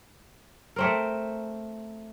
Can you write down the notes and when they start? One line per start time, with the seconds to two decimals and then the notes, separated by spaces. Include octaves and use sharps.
0.76 A3 C4 A#4